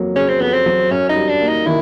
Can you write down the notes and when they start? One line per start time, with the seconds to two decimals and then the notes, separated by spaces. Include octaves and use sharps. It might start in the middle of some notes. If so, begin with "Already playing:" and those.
Already playing: F2 F#3 A#3
0.15 C#3 C#4
0.28 C4
0.40 F2 B3
0.53 C4
0.66 F#3
0.91 F#2 C#4
1.09 D#4
1.16 G3
1.29 D4
1.41 A#3
1.47 D#4
1.66 D#3 E4